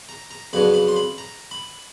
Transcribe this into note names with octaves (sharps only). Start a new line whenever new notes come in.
A#5
A#5
F2 C#3 F#3 B3 D4 B5
B5
C6
B5
A#5
B5